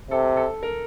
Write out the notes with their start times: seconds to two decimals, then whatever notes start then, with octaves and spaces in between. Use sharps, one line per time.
0.11 C3 A4
0.37 A4
0.63 A#4